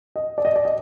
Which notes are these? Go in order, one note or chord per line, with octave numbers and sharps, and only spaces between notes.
D#5
D5
D#5
D5
D#5